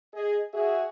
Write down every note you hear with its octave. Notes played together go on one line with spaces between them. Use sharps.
G#4 D#5
F#4 G#4 E5